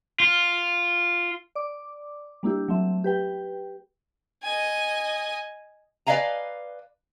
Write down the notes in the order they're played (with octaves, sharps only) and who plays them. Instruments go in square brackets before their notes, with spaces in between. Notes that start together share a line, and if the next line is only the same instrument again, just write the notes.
[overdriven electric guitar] F4
[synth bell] D5 D6
G3 A#3 D4 E4 G4
F#3 A3 C4 E5
G4 B4 G5
[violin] D#5 G#5
[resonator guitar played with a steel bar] B4 D5 D#5 F5 G#5 A#5